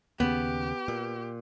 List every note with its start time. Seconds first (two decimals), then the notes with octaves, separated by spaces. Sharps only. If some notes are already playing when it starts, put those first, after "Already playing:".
0.20 D#2 C#3 B3 G4
0.88 A#2